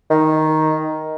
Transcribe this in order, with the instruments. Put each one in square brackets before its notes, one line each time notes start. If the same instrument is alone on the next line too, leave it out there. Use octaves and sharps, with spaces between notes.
[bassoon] D#3